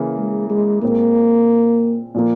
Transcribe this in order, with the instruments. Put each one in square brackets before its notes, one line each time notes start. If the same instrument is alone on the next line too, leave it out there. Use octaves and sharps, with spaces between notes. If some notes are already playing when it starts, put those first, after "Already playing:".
Already playing: [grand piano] C#3 E3 A#3
[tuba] G#3
G#3
[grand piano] A#2 G#3 C4 [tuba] A#3
[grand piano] A#2 F3 A#3